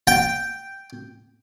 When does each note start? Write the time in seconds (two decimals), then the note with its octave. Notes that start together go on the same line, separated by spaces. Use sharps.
0.07 G5